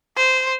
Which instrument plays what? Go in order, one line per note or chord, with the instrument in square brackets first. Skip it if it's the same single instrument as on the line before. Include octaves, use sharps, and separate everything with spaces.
[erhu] C5